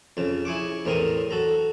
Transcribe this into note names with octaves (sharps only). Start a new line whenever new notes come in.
F2 C#3
E4 G#4 C#6 D6
E2 A2 C4 A#4 A#5 D#6
F#4 A4 A#5